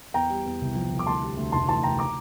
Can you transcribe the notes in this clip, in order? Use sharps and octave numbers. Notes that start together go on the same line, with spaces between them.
E2 G5 A#5
G3
E2
C2
F3
C2
D6
D2 A5 C6
G3
D2
F1 A5 C6
E3 A5 C6
F1 G5 A#5
A#5 D6